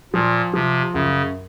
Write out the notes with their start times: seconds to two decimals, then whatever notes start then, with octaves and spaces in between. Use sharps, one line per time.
0.14 A#2 F3
0.54 C3 F3
0.94 F#2 C#3